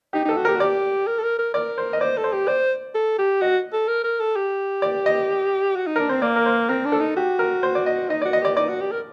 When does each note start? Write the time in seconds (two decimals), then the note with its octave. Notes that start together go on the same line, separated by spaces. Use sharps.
0.13 D#4 G4
0.25 D#4 A4
0.37 F#4
0.45 G4 A#4
0.55 F#4
0.60 G4 D5
1.07 A#4
1.19 A4
1.23 A#4
1.38 A#4
1.54 A#4 D5
1.78 C5
1.93 D#5
2.01 C5 D5
2.17 A4
2.24 C5
2.33 G4
2.48 C5 D5
2.95 A4
3.19 G4
3.41 F#4 D#5
3.73 A4
3.88 A#4
4.04 A#4
4.20 A4
4.36 G4
4.82 D5
5.06 D#5
5.75 F#4
5.87 D#4
5.96 D4 A#4
6.09 C4 C5
6.22 A#3 D5
6.36 A#4
6.46 C5
6.69 C4 A#4
6.85 D4
6.92 A4
7.00 D#4
7.17 F#4 G4
7.39 A#4
7.63 C5
7.75 D5
7.86 D#5
8.10 D#4 D#5
8.22 D5
8.25 F#4
8.33 D#5
8.41 G4 D5
8.56 D#4 D5
8.69 F#4
8.81 G4
8.91 A#4